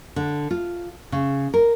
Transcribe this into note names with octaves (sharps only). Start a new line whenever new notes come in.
D3
F4
C#3
A#4